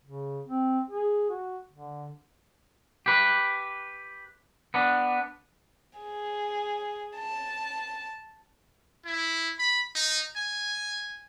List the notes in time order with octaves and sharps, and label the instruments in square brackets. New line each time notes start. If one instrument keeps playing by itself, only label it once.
[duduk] C#3
C4
G#4
F#4
D3
[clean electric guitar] G4 B4
B3 D4
[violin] G#4
A5
[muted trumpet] E4
B5
D#4
G#5